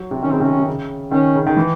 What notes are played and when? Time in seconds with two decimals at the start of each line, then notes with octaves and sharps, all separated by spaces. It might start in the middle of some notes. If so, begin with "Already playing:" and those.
Already playing: F#3
0.11 C3
0.22 D#3 C#4
0.32 C#3 C4
0.40 C3
0.44 C#4
0.50 C#3
0.59 C3
0.67 C#3
1.11 D#3 C#4
1.35 C#3
1.47 D#3
1.57 E3